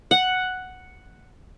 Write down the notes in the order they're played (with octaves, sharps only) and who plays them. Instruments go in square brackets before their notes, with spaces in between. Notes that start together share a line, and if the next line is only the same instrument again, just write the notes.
[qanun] F#5